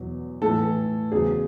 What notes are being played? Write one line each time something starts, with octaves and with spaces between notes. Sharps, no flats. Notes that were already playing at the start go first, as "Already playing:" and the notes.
Already playing: E2 B2 F#3
A2 E3 A4
E2 C#3 F#3 G#4